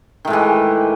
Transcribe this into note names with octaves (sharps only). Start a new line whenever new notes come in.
A2 D#3 E3 G#3